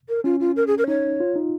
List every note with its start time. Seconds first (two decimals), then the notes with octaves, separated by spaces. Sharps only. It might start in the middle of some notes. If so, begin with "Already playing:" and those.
0.09 A#4
0.24 C#4 F4
0.40 F4
0.56 A#4
0.67 G#4
0.78 A#4
0.88 D#4 C#5
1.20 F4
1.36 D#4